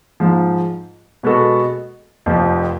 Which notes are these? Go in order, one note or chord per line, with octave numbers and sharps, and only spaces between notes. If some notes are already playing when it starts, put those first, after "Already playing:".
G#2 F3 G#3
B2 G#3 B3 F#4 A4
F1 F2 F3